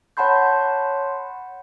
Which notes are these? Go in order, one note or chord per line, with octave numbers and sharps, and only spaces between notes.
C#5 F#5 A5 B5 C6 G6